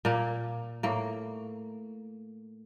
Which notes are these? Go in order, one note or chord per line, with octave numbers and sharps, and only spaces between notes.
A#2 A#3
A2 A#3